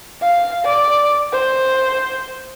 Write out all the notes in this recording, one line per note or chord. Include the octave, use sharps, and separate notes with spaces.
F5
D5
C5